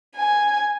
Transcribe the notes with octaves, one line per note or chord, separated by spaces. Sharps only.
G#5